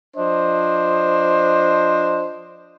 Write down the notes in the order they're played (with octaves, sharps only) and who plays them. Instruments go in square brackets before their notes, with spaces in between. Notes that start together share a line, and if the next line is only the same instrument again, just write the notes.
[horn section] F3 D4 C5 D#5